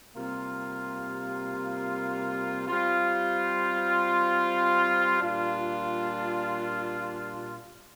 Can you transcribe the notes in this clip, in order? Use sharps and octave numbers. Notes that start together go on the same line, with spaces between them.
C3 G3 A#3 F4
G3 C4 F4
A#2 G3 D4 F4